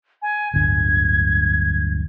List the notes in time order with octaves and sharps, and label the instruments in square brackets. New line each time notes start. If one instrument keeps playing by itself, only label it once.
[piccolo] G#5
[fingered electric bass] D1 G1 D3 [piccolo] G#6